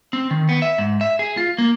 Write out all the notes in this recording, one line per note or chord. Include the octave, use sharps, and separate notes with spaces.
C4
D#3
B3
E5
G#2
E5
G#4
F4
A#3